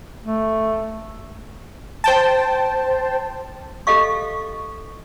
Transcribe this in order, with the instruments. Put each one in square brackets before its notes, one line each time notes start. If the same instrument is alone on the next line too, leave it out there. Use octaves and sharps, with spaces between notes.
[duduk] A3
[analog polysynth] C5 G5 A5
[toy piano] G4 A4 D#5 F5 C#6